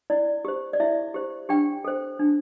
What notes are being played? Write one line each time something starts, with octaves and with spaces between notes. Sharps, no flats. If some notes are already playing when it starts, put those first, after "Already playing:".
E4 D5
G4 C5
D5
E4 E5
G4 C5
D4 G4 G5
A4 C5
D4